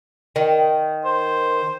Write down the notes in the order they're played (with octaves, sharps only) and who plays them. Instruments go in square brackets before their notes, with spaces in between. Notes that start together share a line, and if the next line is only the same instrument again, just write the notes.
[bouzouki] D#3
[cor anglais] C5